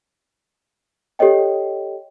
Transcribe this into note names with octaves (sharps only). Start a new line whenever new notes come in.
G4 A4 C#5 D#5 G5